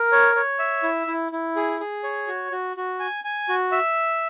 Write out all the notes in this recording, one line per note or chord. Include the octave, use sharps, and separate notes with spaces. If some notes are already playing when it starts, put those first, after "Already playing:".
Already playing: A#4
C#5
C#5
E5
E4
E4
E4
G#4
G#4
C#5
F#4
F#4
F#4
G#5
G#5
F#4
E5